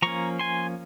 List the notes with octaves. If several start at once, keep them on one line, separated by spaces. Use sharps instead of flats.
F3 A#3 C#4 A#5 C#6
G#5 C6